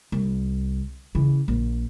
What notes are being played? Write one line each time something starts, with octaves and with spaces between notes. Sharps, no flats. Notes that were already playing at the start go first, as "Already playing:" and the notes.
C2
C#3 E3
A#1